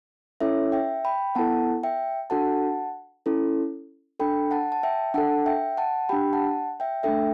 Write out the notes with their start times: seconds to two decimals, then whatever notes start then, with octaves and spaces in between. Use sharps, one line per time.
0.41 C#4 E4 A4 C#5 E5
0.72 E5 G5
1.05 G5 B5
1.35 B3 E4 A4 F#5 A5
1.83 E5 G5
2.30 D4 F#4 A4 F#5 A5
3.26 C#4 E4 A4
4.20 D4 A4 G5 B5
4.51 F#5 A5
4.72 A5
4.83 E5 G5
5.14 D4 A4 F#5 A5
5.46 E5 G5
5.77 F#5 A5
6.09 D4 G4 G5 B5
6.33 F#5 A5
6.80 E5 G5
7.03 A3 D4 A4 E5 G5